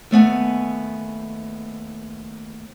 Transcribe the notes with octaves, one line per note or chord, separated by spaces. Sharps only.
D#2 A3 B3 G#5